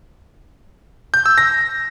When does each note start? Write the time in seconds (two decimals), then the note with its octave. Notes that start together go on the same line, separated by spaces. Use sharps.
1.14 G6
1.26 E6
1.38 A#6